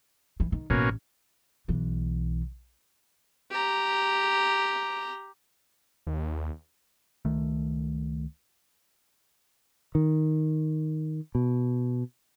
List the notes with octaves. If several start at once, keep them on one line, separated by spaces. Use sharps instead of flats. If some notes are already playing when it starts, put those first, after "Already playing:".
E3
D#3
A1 B2 A#3 C#4
B1 E3
G4 A#5
D#2
C#2 D#3 A3
D#3
B2